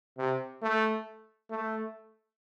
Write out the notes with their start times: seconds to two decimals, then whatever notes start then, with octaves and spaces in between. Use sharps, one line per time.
0.18 C3
0.62 A3
1.50 A3